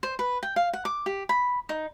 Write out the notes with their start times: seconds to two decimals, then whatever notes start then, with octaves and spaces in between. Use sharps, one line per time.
0.03 C5
0.19 B4
0.43 G5
0.56 F5
0.73 F#5
0.85 D6
1.06 G4
1.29 B5
1.69 D#4